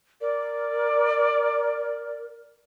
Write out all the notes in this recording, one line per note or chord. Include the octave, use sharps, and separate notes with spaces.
A#4 D5